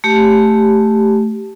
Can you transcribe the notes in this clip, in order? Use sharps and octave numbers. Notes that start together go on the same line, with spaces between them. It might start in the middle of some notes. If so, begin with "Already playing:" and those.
A3 G4